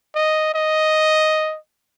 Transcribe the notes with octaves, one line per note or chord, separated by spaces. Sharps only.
D#5
D#5